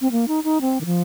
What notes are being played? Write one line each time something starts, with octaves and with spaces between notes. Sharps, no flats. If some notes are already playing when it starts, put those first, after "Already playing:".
C4
A#3
D#4
D#4
C4
D#3
F3